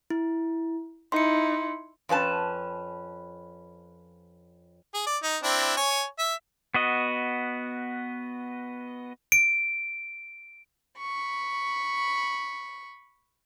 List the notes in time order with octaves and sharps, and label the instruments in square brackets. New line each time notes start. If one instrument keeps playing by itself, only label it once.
[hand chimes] E4
[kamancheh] D#4 E4 [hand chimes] C6 C#7
[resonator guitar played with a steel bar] F2 C#4 B4 A5
[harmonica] G#4
D5
D#4
C4 D4 E4
C#5 G#5
E5
[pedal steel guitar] B3 F#4 D#5
[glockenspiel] D7
[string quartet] B5 C#6